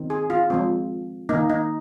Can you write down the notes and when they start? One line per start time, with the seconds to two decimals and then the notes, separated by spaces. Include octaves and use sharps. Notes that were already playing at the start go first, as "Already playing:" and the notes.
Already playing: D#3 C4
0.10 G#4
0.30 F4
0.50 F3 G#3 C4
1.29 D#3 A#3 D#4
1.50 D#4